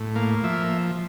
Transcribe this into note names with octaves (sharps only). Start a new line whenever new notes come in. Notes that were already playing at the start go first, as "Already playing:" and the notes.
Already playing: A2
A#3 F5
F3 E5